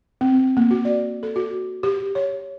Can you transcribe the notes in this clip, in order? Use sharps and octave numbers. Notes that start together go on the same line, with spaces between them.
C4
A#3
F#4
D5
A4
F#4
G4
C#5